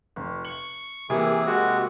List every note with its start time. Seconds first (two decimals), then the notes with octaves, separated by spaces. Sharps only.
0.16 F1
0.45 C#6 F#7
1.10 C3 E3 A#3 G#4
1.47 G#3 F#4